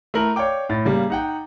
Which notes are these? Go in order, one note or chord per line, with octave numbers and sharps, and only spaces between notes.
A3 E4 A#4 F#7
C#5 D5 F5 G5 D6
A2 A6
C#3 G3 A#3
D#4 F#5 G5